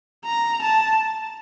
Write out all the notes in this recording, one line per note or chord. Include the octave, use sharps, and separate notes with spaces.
A#5
A5